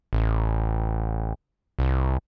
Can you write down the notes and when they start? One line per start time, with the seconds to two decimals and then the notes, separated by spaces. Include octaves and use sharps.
0.13 A1
1.79 C2